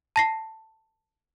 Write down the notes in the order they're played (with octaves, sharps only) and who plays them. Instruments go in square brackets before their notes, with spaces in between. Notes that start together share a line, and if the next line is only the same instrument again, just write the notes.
[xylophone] A5 A#6 C7